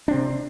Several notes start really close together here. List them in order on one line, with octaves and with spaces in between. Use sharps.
D4 C4 C3